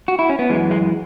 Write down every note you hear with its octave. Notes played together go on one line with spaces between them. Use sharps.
F#4
E4
C#4
B3
F#2 E3 G#3
G#3